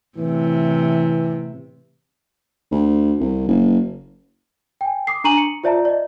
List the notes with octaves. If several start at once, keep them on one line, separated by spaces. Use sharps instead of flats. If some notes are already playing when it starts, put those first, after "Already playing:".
A2 C3 E3
D2
C2
F#1
G5 G#5
D6 D#6 C7
D4 G#5 A#5 C#6 D#7 F#7
C#7
F4 C5 D5 E5 A5 A#5
D5 D#5